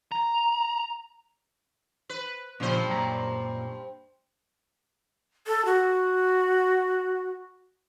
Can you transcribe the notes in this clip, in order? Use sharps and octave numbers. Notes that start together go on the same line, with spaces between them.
A#5
B4
G2 A#2 C#3 F3 C5
F#2 A#2 A#5
A4
F#4